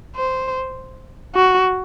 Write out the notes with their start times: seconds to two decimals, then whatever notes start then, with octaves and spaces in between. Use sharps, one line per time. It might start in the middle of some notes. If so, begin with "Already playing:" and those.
0.16 C5
1.35 F#4